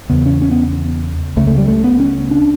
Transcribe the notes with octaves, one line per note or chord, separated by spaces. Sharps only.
E2 C#3 B3
C#4
C#4
B3
C#2 C#3 A3
A3
G3
A3
B3
C#4
D4